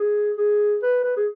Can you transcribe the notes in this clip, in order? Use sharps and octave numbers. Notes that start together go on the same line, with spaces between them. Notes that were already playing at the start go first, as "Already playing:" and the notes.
Already playing: G#4
G#4
B4
B4
G#4